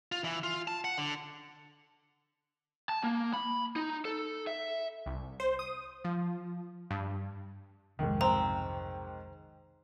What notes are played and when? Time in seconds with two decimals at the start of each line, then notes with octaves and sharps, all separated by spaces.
0.12 F4
0.24 E3
0.43 F4
0.68 A5
0.84 F#5
0.98 D3
2.89 A5
3.03 A#3
3.33 B5
3.76 D#4
4.05 A4
4.47 E5
5.06 C2
5.40 C5
5.59 D#6
6.04 F3
6.91 G2
7.99 B1 F2 G#2 C3 D#3
8.21 C4 A#5